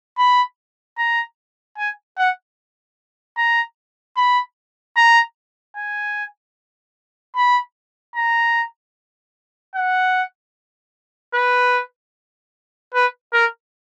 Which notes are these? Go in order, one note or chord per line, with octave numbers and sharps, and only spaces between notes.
B5
A#5
G#5
F#5
A#5
B5
A#5
G#5
B5
A#5
F#5
B4
B4
A#4